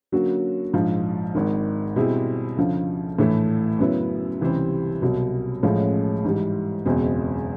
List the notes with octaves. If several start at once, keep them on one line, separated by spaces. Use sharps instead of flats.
D3 F#3 A#3 C#4 F#4
A#1 G#2 F3
G#1 G#2 D#3
B2 G3 C4 E4 G#4
D2 C#3 F3
A#1 A2 E3 A3
F#2 C#3 F#3 B3 E4
C#2 C3 E3 G3 C4
C2 B2 F#3
A1 A2 F3 G#3 C#4
G#2 E3 G3
F#1 E2 B2 G#3 C4